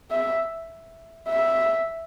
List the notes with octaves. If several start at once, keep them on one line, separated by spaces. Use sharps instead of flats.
E5
E5